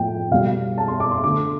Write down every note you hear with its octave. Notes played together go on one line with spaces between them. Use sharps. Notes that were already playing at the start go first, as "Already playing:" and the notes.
Already playing: A2 F3 A3 G5
B2 G3 F5
A5
C6
D6
C6
D3 A3 D6